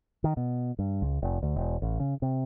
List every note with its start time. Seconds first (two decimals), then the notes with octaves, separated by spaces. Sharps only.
0.24 D#3
0.37 B2
0.79 G2
1.02 C#2
1.22 F1
1.43 D2
1.56 E1
1.82 A1
2.00 C#3
2.22 C3